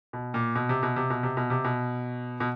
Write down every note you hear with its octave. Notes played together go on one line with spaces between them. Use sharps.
B2
A#2
B2
C3
B2
C3
B2
C3
B2
C3
B2
B2